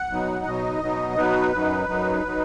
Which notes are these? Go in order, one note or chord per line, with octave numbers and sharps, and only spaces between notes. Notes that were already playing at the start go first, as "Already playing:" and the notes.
Already playing: F#5
B2 F#3 B3 D#4
B2 F#3 B3 D#4 D#5
B2 F#3 B3 D#4
B2 F#3 B3 D#4 B4
F#2 F#3 D#4
F#2 F#3 D#4
F#3 D#4